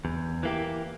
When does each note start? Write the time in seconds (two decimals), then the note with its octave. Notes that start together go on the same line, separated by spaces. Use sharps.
0.05 E2
0.43 E3 A#3 E4 G4